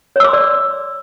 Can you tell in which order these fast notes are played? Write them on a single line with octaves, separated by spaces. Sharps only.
C#5 E6 D6 C6 D5